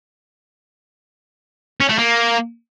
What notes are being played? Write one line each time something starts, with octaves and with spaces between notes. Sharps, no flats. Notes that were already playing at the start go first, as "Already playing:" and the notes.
C#4
A3
A#3